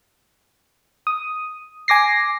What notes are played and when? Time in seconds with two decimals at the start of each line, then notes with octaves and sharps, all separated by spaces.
1.07 D#6
1.88 G#5 D6 A#6 C7